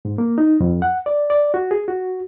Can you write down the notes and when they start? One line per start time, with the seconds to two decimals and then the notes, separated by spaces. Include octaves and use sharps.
0.05 G#2
0.18 A#3
0.38 D#4
0.60 F2
0.82 F#5
1.06 D5
1.30 D5
1.54 F#4
1.71 G#4
1.88 F#4